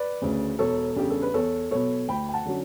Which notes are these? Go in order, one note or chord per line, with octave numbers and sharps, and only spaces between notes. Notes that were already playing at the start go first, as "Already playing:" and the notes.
Already playing: B4 D5
D2 C#3
E1 A4 C#5
E2 C#3 G3 D4 G4
A4
B4
E2 A4 C#5
B2 F#3 B3 A4 C#5
D2 G5 B5
G5
F#5 A5
D3 F#3 C#4